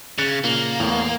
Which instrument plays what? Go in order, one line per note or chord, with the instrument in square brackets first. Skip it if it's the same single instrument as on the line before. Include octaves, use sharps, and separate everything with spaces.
[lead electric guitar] C#3 [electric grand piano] F#6 A6 C#7
[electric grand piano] A#2 C#3 [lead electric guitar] A#3
[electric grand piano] E2 A2